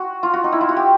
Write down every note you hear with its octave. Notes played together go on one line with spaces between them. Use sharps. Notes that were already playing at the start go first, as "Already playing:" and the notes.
Already playing: F#4
F4
F#4
D#4
E4
F4
F#4
G4